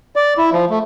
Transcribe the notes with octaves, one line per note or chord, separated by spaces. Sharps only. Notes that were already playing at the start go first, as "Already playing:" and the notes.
D5
E4
F3
A3